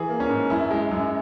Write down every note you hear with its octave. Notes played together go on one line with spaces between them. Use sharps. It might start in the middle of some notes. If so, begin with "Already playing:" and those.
Already playing: E3 G#4
A#3
C#4
G#2
F#2 E4
G#3
F#2